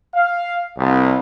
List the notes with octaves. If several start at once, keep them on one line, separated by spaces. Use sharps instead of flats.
F5
C2